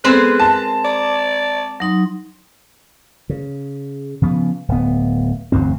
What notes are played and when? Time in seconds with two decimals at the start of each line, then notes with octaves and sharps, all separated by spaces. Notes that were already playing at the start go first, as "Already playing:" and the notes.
0.04 G#3 B3 C4 G#4 A4 B4 C5
0.40 A#4 A5
0.85 D5 A#5
1.80 F#3 D#4 C6
3.29 C#3
4.22 C#3 F3 B3
4.68 D1 B3
5.52 E1 D2 G2 C4